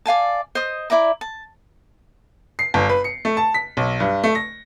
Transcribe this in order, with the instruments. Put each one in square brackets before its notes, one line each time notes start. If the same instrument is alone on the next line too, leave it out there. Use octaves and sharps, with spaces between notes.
[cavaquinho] D5 F5 G#5 A5
C5 D#5 D#6
E4 D5 E5 A#5
A5
[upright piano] C7
G1
B4
C#7
A3
A5
B6
B1
G2
A3
A#6